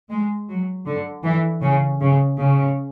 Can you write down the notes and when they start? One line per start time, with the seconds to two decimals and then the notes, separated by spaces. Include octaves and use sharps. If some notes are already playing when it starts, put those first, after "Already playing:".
0.11 G#3
0.49 F#3
0.86 D3
1.24 E3
1.62 C#3
2.01 C#3
2.38 C#3